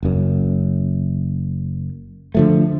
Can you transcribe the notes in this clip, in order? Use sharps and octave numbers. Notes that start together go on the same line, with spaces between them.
F#1 F#2
D3 F3 A3